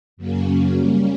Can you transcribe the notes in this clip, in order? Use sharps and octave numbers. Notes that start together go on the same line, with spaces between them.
F#2 C#3 F#3 A#3 C#4
G3 A#3 C#4